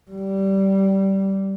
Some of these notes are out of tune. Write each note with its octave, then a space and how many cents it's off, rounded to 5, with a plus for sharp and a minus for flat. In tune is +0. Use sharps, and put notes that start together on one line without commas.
G3 -15